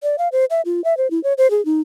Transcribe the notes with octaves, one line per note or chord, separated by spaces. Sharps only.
D5
F5
C5
E5
F4
E5
C5
E4
C#5
C5
G#4
D#4